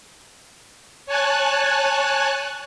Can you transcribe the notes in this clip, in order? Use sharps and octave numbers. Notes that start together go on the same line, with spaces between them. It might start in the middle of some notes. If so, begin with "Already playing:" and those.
C#5 G#5 A5 F#6